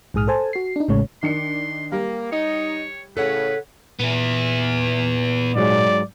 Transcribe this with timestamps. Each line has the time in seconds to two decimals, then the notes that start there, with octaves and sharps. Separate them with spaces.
0.14 A#1 G#2 G#4 D#6 F6
0.28 A4 C5 G#5 A5
0.53 F#4 C7
0.76 D4 D#4
0.88 A1 A2 C#3 G#3 C#5
1.23 D#3 D4 C6 C#7
1.92 G3 A#3
2.32 D#4 C#5
3.17 A2 C#3 A4 B4 C#5 F#5
3.99 A#2 B3 E4
5.56 G#2 F#3 G#3 D5